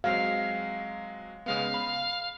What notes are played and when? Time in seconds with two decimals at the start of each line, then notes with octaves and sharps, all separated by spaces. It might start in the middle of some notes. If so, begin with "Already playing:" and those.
0.04 F#3 G#3 C4 F5
1.46 C#3 G#3 B3 F5
1.74 B5